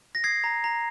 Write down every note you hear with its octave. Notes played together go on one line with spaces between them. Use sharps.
A#6
D#6 G#6 C7
A#5
A#5